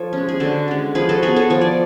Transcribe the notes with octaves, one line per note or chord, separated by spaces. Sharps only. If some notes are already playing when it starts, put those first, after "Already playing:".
Already playing: F3 A4 C#5
G#3 C#4
G#4
D3 F#4 A4
G#3 C#4
F3 G#4 B4
F#4 A4
B3 G#4 B4
A4 C#5
F3 C#5
D5